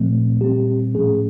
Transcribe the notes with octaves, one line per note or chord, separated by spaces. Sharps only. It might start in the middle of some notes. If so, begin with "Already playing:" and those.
Already playing: A#2 F3 A3 C4
A#2 G3 C4 G4
A2 F3 A3 C#4 G#4